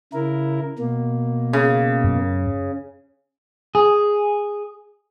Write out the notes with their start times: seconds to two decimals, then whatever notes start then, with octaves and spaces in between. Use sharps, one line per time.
0.13 C#3 E4 A#4
0.79 B2 A#3
1.53 C#3
2.04 F#2
3.75 G#4